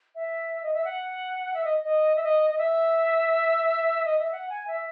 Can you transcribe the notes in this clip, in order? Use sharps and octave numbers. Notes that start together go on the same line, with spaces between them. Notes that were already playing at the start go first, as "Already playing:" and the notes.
E5
D#5
E5
F#5
E5
D#5
D#5
E5
D#5
D#5
E5
D#5
E5
F#5
G#5
E5